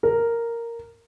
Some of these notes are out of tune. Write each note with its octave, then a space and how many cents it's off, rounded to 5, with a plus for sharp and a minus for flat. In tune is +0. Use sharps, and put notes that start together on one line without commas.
A#4 -5